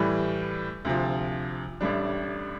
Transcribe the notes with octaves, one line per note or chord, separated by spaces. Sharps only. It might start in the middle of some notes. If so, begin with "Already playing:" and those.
Already playing: A2 E3 G3
D2 C3 F3
A1 A2 G3 D4